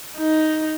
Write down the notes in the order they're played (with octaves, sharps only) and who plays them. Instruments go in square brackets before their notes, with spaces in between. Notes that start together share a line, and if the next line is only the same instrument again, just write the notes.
[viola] D#4